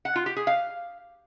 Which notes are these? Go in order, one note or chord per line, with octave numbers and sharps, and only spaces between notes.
F#5
F4
G4
G#4
F5